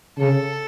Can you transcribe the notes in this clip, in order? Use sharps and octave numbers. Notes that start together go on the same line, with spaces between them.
C#3 A4